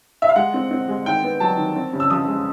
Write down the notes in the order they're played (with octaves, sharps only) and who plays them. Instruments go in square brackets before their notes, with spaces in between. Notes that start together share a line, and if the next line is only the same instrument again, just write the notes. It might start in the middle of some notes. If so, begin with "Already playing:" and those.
[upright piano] E5
F5
G#3 F#5
C4
C4
G#3
D#3 G5
B3
F#3 A5
D#3
C4
C#3
E6
F3 D#6
G#3